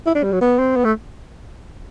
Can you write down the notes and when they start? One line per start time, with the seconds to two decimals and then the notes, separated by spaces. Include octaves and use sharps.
0.06 E4
0.15 D4
0.23 G3
0.32 F#3
0.41 B3
0.58 C4
0.76 B3
0.85 A3